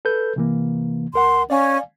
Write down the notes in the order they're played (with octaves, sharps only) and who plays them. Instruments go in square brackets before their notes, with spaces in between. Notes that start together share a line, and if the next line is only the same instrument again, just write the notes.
[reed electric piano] A4 B4 G6
C3 E3 A#3
[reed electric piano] C#2 A#4 F#5 [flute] C6
[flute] C#4 [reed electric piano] D5 F5 G#5